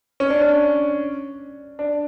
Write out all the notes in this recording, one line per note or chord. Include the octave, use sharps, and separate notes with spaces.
C#4
D4
C#4
D4